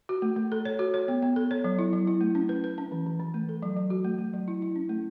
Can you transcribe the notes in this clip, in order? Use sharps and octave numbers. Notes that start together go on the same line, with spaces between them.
F#4
A3
A3
A4
C#5
F#4
C#5
B3
B3
A4
C#5
F#3
E4
F#3
E4
A3
C#4
B4
B4
C#4
E3
E3
E3
A3
A4
F#3
F#3
F#4
A3
A3
F#3
E4
E4
C#4
A3